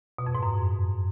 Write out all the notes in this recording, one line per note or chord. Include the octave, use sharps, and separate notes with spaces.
B2
F2
G#2
F#2